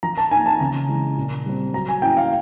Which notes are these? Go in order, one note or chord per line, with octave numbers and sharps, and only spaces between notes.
F3 A#5
A5
A#3 D#4 G#5
A5
C#3 A#5
E3 G#3
A#2
G3 C4
F#3 A#5
G#5
A#3 C#4 E4 G5
F5